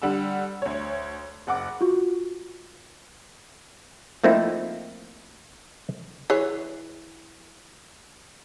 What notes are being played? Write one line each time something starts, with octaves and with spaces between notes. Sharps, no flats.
D3 G3 F#5 E6
D2 C#5
F#1 F#5 D6
F4 F#4
F3 A3 A#3 C4 D#4 E4
E3 G#4 C#5